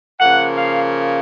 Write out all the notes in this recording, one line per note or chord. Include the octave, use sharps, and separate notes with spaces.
C#3 F3 A#3 F#5
F5